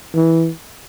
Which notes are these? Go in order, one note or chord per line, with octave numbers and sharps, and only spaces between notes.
E3